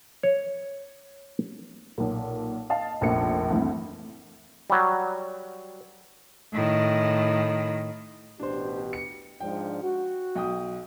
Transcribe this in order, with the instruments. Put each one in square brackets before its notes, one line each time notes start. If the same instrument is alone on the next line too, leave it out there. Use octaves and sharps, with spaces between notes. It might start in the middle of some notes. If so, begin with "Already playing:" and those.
[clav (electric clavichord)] C#5
[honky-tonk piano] B1 A#2
D#5 F5 A5
F1 A#1 F2 A#2 C#7
D2 G2 E3 C4
[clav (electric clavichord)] F#3 G3
[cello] A2 D#3
[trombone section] A1 B2 G4 [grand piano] D4 C5
[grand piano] C#7
[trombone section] G#2 F3 D4 [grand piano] G5
[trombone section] F#4
[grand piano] B1 G5 D#6